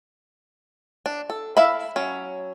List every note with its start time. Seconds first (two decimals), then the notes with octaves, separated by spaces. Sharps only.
1.06 D4
1.30 A4
1.57 E4 A4 E5 F5 B5
1.96 F#3 C#4